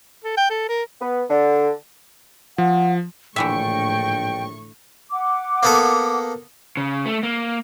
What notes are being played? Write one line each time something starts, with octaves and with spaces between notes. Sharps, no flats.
A4
G5
A4
A#4
B3
D3
F3 F#5
A#1 A2 D3 E3 E5 G5 C#6
F#5 D6
A#3 B3 A4
C#3
A3
A#3